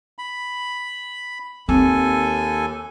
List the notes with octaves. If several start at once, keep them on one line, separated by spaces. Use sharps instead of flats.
B5
D#2 C4 A4 G#5